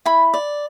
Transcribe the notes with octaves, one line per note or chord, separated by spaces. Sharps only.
E4 B5
D5